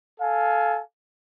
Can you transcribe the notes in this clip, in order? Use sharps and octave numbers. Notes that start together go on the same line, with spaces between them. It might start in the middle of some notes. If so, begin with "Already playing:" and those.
A4 F5 G#5